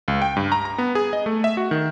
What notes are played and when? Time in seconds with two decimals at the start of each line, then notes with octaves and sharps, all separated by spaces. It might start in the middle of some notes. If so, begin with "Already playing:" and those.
0.08 C#2
0.22 G5
0.37 G2
0.52 A#5
0.65 A#5
0.78 B3
0.95 G#4
1.13 D#5
1.26 A3
1.44 E5
1.57 F#4
1.71 D#3